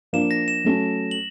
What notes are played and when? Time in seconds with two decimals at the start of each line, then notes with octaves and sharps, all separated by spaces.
0.13 F3 A#3 D4 E7
0.31 A#6
0.48 E7
0.65 F#3 A3 C#4
1.11 F#7